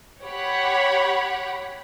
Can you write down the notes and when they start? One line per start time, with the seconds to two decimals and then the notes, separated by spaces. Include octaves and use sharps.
0.23 G4 C#5 F#5 B5